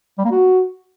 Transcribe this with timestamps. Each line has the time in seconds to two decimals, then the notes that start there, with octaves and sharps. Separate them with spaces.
0.18 G3
0.25 A#3
0.31 F#4